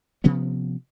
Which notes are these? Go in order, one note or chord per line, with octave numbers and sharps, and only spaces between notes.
C3 F3 B3 C#4